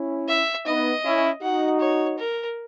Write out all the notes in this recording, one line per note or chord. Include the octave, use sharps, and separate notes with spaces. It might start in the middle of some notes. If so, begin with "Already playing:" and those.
Already playing: C#4 E4
E5
B3 D#4 D#5
C#4 E4
D#4 F#4 F#5
C#5
A#4